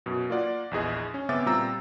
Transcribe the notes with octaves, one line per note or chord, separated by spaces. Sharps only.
F#2 B2
A#3 F4 D5 F#5
A#1 E2 G#4 D#5
C#4
C#3 B3 C4 E5 D6 A6
A#2 G3 C4 A#5 E6